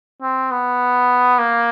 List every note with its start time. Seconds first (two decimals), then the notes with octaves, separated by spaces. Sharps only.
0.22 C4
0.51 B3
1.39 A#3